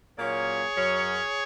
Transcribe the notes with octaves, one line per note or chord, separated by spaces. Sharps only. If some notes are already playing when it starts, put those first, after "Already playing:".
A#2 F#3 A#3 C#4 G#4 C#5
F#2 F#3 C#4